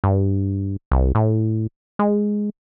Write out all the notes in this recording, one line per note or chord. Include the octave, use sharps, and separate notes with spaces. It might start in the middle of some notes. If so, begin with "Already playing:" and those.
G2
C2
A2
G#3